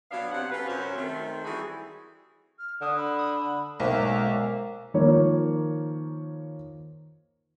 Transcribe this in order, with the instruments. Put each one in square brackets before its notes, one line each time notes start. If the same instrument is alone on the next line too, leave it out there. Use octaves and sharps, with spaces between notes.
[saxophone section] B2 F#3 B3 D4 F5
C3 F#5
C#4 F4 A4 B4
F#2 C3 F#3 C#4 F#4 C5
D#3 A3 C4
E3 G3 E4 F#4 G#4
[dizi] F6
[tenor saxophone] D3 [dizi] D#6
[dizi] B5
[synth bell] D#6
[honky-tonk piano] B1 [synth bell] G#3 C5 E5 [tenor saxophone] A#3 [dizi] A#5
[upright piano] D#3 F3 A#3 C#5